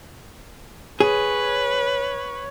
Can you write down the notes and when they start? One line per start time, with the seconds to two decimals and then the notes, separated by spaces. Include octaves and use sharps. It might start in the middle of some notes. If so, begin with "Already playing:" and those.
1.00 G#4 B4 C#5